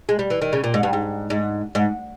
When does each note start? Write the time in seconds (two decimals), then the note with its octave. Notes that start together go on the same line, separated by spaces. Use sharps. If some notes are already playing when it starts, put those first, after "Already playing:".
0.09 G#3
0.19 G3
0.30 E3
0.42 D#3
0.53 C#3
0.64 A#2
0.74 G#2
0.83 G2
0.93 G#2
1.30 G#2
1.75 G#2